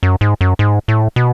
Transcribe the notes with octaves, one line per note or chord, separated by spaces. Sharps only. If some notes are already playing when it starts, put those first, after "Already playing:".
F#2
G#2
F#2
G#2
A2
B2